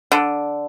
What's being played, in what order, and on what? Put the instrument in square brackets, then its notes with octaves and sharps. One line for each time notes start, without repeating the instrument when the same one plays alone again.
[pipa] D3